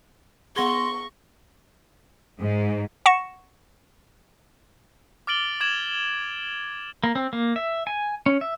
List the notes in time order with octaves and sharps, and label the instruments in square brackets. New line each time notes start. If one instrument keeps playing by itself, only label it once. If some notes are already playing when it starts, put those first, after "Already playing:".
[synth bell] B3 A#6 G7 [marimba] G#4 F#5 [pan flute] C6 [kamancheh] C#6
[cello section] G#2
[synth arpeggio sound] F#5 C#6 A#6 C#7 E7
[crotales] D6 F6 A6 D7 F#7 G7
D6 G#6 E7 F#7
[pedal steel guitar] A#3
C4
A#3
E5
G#5
C#4
E5